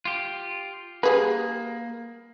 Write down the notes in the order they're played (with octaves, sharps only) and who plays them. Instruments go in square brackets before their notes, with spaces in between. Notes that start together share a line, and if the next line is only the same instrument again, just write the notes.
[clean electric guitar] F4 G4
[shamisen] G3 G#4 B4 [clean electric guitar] A#3